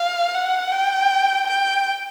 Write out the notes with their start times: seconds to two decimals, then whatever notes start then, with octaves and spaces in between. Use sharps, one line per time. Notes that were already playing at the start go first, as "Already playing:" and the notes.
Already playing: F5
0.35 F#5
0.72 G5
1.47 G5